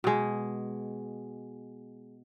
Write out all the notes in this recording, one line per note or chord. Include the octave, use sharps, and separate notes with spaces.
B2 G#3